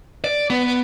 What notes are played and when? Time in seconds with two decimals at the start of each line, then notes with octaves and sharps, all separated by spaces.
0.24 D5
0.50 B3